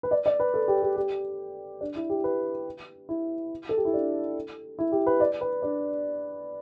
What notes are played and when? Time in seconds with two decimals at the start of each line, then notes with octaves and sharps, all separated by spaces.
0.03 B4
0.11 D5
0.26 D5
0.40 B4
0.54 A4
0.68 G4
0.82 G4
0.96 G4
1.81 D4
1.96 E4
2.09 G4
2.24 B4
3.09 E4
3.69 A4
3.77 G4
3.85 E4
3.94 D4
4.79 E4
4.92 G4
5.07 B4
5.20 D5
5.41 B4
5.63 D4